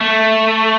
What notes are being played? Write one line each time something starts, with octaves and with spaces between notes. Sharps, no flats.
A3